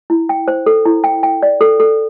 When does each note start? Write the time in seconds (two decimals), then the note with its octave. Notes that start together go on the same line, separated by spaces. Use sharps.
0.10 E4
0.29 G5
0.48 C5
0.66 A4
0.85 E4
1.04 G5
1.23 G5
1.43 D5
1.61 A4
1.80 A4